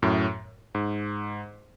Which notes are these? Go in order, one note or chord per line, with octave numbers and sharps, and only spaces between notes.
F#2 A2
G#2